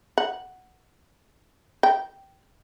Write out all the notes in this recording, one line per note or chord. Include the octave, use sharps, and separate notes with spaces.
F#5
G5